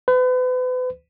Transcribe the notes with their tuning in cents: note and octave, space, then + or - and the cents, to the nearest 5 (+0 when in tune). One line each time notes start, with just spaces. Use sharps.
B4 +40